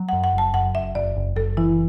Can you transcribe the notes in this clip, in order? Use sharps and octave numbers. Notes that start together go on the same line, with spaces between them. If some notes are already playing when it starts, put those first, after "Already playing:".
Already playing: F#3
F#5
F#2
F#5
F#1 A5
F#2 F#5
F#1 E5
F#1 D5
F#1
F#1 A4
E3 E4